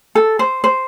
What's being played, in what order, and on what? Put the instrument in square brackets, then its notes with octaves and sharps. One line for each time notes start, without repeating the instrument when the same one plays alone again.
[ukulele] A4
C5
C5